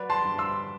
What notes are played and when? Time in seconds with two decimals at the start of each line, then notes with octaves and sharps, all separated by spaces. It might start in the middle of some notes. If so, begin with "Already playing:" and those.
Already playing: F#3 B4 D5
0.10 A5 C6
0.24 G2
0.38 C6 E6